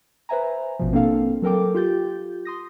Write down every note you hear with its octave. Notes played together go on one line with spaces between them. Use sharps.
B4 C5 E5 G#5 A#5
A1 B2 F3
A#3 C4 D4 A4 F5
F#3 A4 A#4 G5 D6
F4 G4 G6 A6
C6 D#6 A#6